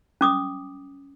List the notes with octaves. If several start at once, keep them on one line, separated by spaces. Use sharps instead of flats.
C#4 D6 D#6